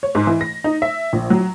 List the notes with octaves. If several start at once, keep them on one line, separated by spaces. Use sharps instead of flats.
C#5
G#2
E3
A#6
D#4
E5
A#1
F#3